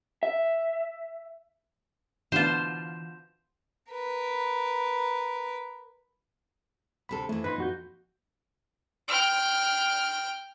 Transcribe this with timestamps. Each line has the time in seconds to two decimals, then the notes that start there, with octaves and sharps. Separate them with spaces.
0.23 E5
2.32 B2 D3 E3 B3 F4 C5 G6 E7
3.92 A#4 B4
7.09 D2 C3 A4 B5
7.29 F2 E3 A3
7.44 A#2 D#4 B4 B5 C6
7.58 F2 F#4 G6
9.08 G5 F6